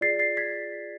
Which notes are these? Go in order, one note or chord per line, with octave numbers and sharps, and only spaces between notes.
F4 G#4 D5 A6 C7
A6 C7
G#6 B6